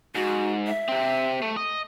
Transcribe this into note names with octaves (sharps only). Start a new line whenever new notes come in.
G#2 F#4
E5
C3 C4
A3
D#5